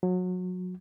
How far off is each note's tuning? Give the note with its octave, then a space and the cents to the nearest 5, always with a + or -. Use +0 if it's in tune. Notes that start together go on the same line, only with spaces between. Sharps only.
F#3 -25